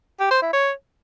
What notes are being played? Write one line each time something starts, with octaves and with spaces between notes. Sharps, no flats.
G4
C5
E4
C#5